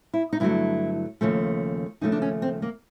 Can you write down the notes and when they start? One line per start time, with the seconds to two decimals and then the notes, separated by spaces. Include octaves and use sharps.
0.14 E4
0.33 D#4
0.40 G2 D3 F#3 A3 E4
1.21 D#2 C#3 F3 A3
2.01 D#2 C#3 F3 A3 D#4
2.12 D4
2.22 C#4
2.42 C4
2.62 A#3